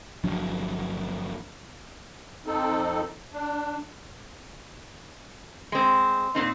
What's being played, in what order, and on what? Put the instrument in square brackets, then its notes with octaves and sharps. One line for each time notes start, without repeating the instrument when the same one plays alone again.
[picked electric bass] G1 F3 F#3 D4
[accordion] F2 C4 D#4 A4
D4
[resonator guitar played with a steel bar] G#3 C4
A#2 C4 D#4